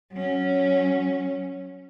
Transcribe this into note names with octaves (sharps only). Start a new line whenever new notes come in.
F#3 C#4